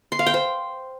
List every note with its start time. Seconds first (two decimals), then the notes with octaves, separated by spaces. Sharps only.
0.12 C6
0.19 F5
0.26 G5
0.34 C5